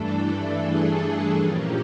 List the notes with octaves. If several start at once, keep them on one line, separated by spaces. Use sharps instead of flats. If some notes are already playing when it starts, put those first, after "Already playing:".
Already playing: G2 E3 A3 D4 A4
G#4
A#2 F3 A#3 C#4 G4